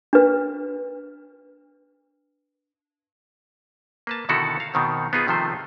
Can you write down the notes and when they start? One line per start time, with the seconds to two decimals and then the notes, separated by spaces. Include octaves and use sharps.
0.13 D4 B4
4.07 A#3 B4 A5
4.29 B2 D3 D#3 E4 F#4 A4
4.60 F5
4.74 B2 D#3 C4
5.13 B3 D#4 F4 G#4
5.27 C3 D#3 F3 A3 C5